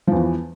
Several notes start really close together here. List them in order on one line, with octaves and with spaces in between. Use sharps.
F3 E2 E3